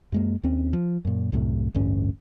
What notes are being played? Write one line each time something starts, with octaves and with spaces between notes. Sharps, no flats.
F#2 G#3 A#3
D#2 C4 C#4
F3
F#2 A#2
C2 F#2 A2 C3
A1 D2 G2 C#4